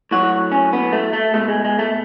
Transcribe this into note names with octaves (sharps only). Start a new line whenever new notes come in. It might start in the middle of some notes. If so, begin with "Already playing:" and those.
A2 F#3 F#4
C#4
B3
A3
A3
B2 G#3 A3
G#3
G#3
A3